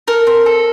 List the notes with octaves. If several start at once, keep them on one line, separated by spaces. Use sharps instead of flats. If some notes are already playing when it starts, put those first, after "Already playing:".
A4 A#4
C4
A4